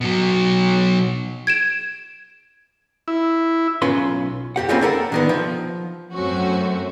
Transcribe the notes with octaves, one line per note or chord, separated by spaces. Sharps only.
B2 F#3
G#6 D7 E7
E4
B1 C#4 F4 B4 C6
F2 G4 F#5
G3 A#3 C4 C#4 F4 G#4
A#3 G4 A4 A#4 F#5
D3 D#3 B3
F3
F#2 F#3 A3 C4 C#4 F#4